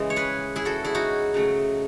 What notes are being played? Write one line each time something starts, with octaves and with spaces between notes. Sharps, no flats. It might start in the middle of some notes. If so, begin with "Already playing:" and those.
Already playing: C#3 E3 G#3 D#5
C#5
G#4 B4
E4 G#4
F#4 A4
E4 G#4
D#4 F#4
C#3 F#3 A3